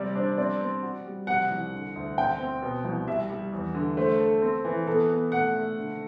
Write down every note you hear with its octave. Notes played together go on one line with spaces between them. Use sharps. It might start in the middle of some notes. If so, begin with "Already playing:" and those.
Already playing: C3 G3 D5
D4 C5
C4 D5
C4
F#4
G3
C3 F#5
C2
D3
D2
C4 G5
C4
B2
C2
G3 E5
G3
E2
D3
A3 C5
A4
C4
E3
B3 A4
B3
A3 F#5
A3
D3